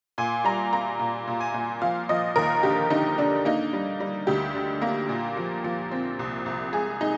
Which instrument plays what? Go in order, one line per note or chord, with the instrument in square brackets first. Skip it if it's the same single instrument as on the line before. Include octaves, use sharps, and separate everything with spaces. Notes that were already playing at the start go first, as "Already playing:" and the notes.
[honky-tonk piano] A#2 G#5
G3 A#5
A#3 A#5
A#2
A#2
G#5
A#2
F3 F5
F3 D#5
D#2 A#4
D3 G4
D3 D#4
D3 D4
A#3 D#4
G3
G3
D2 G4
D3
A#3
A#2
F3
F3
C4
C2
C2
G#3 G#4
G#3 D#4